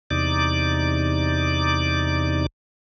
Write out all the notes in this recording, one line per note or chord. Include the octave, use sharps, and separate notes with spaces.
E2 C3 D#4 D5 D6